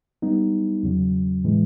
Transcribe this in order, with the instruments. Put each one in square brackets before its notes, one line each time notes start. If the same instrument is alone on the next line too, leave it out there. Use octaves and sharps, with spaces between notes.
[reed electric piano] G3 B3 D#4
E2 C#3 F#3
A2 E3 G#3